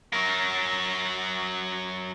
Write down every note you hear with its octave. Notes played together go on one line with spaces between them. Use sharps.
F#3 A#4